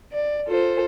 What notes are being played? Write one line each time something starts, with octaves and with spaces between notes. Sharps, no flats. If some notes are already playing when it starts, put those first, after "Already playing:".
D5
F4 A4 C5